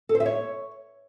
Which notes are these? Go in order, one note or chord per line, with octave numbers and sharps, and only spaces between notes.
A4
C5
E5
C#5